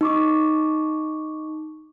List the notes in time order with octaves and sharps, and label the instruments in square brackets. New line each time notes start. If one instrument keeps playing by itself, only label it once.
[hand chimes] D#4 C#6 D6